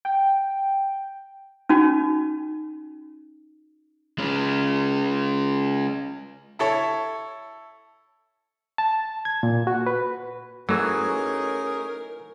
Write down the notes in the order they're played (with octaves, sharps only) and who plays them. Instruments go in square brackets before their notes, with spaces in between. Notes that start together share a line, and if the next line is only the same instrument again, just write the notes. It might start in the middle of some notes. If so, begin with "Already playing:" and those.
[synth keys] G5
[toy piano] C#4 D#4 F#4
[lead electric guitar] G#3 C#4
[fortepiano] E4 A4 C#5
[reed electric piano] A5
G#6
A#2
F#4
B4
[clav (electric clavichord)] E3 F#3 [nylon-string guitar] A3 [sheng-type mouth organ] C#4 D#4 G#4 [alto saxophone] A#4